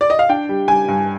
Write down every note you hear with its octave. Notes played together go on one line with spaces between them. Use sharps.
D5
D#5
F5
D4 G5
G3
G3 G#5
G2